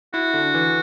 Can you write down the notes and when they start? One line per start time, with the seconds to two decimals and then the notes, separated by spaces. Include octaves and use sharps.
0.13 E4 F#4
0.34 D3
0.54 E3